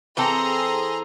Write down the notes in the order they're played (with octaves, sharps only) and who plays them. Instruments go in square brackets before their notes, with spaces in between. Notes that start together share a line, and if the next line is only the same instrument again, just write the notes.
[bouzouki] E3 C4 A4 [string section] G#4 A#5 C6